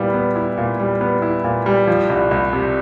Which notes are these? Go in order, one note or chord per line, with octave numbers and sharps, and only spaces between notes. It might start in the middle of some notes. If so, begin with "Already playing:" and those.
Already playing: A#2 G3 B3 E4
B3
E4
A#2
G3
B3
E4
A#2
G3
F3
C2
C2
C3